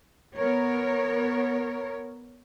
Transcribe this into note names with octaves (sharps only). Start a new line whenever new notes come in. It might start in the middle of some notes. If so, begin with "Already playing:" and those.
B3 A#4 C#5